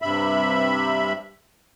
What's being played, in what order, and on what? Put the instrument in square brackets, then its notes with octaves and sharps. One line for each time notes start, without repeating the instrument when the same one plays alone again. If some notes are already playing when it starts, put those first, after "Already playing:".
[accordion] G2 C3 E5 B5